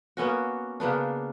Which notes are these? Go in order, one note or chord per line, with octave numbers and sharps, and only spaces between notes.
A#3 B3 C#4 F#4
C#3 A#3 B3 D4